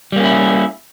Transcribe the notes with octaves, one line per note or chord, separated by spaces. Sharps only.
G3 A#3 C#4 E4